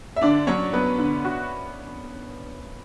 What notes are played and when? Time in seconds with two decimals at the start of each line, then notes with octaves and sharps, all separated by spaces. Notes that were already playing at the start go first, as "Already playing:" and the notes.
0.16 E5
0.22 D3 D4 D5
0.47 F#3 C#4 C#5
0.73 F#3 B3 B4
0.99 D3
1.25 F#4